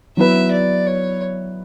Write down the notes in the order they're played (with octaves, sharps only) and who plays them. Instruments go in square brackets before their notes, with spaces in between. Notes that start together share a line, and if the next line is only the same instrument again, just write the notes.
[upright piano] F#3 B3 E4 B4 [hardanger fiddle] E5
[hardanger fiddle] D5
C#5